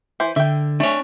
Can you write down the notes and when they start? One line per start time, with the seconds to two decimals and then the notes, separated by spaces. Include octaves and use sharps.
0.20 E3 C5
0.36 D3 E5 G5
0.80 A3 D4 C#5